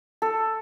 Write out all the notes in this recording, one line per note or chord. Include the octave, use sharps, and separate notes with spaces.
A4